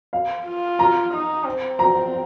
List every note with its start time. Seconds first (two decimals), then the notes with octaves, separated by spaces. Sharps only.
0.13 F5
0.47 F4
0.79 A#5
1.13 D#4
1.46 C4
1.79 A#5